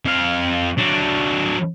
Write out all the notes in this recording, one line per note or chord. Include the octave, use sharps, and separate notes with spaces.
F2 F5
F#3 D4